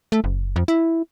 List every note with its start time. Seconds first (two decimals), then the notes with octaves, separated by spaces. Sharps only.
0.12 A3
0.24 F#1
0.56 F2
0.68 E4